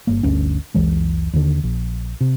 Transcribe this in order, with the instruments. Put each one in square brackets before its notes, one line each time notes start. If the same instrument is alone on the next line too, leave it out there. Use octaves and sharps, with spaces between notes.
[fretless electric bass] G1 A#3
G1 D2 C#4
F#1 C#2 E3 G#3
D#2 D3
A#1
C3